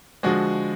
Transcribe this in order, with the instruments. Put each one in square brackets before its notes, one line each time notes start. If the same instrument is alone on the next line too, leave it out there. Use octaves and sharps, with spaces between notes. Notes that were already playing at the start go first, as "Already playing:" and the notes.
[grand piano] D3 F3 G#3 F#4